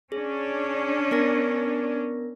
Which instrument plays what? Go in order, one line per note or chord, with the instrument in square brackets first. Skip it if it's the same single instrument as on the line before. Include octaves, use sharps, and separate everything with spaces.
[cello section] C#4 D4 [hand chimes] G#4
[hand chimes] B3 A#4 A#6